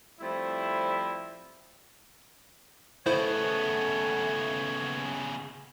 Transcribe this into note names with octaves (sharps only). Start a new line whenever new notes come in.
F3 G3 A3 C4 E4
C#3 A3 B3 E4 C5 C#5